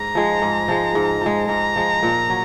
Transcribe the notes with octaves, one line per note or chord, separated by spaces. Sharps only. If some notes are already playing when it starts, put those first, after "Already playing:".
Already playing: G#2 A#5
F3 G#3
G#2
F3 G#3
G#2
F3 G#3
G#2 A#5
F3 G#3
A#2
F#3